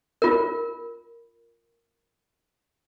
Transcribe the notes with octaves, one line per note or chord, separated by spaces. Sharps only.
F4 A#4